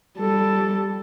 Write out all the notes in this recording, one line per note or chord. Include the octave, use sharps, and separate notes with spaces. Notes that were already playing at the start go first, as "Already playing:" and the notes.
G3 A4